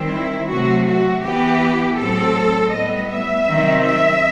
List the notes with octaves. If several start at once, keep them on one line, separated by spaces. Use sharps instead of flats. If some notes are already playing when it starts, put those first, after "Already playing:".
Already playing: D#3 G3 C4
E4
C3 F#3 A3 F#4
F#4
E3 B3 G4
A2 F#3 C4 A4
A2 G3 B3 D#5
E5
C3 D#3 F#3 C4
E5